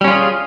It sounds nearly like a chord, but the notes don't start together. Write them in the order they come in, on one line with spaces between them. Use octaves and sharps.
G3 C#4 F4 G#4